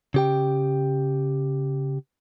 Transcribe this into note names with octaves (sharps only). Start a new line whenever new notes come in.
C#3 G4 G5